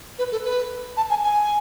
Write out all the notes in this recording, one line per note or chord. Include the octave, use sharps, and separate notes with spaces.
B4
A4
B4
A5
G#5
G#5